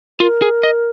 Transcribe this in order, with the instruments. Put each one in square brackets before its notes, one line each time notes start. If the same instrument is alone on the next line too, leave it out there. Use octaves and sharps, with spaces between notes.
[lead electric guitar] F4 [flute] A#4
[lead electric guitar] G#4
D#5